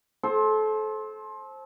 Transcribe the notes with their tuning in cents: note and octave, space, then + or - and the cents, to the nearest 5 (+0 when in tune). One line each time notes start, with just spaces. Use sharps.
A4 -30 C5 +20